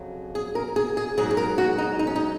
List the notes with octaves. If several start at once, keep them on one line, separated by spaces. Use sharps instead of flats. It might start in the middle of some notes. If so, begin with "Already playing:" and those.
Already playing: F2 C#3 F#3
G#4
A#4
G#4
G#4
G#2 F#3 G#4
G#4
A#4
F#4
D#4
D#4
C#4
D#4